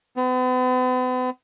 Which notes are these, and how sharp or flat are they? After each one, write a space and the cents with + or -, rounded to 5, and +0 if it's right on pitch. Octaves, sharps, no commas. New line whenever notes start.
B3 +45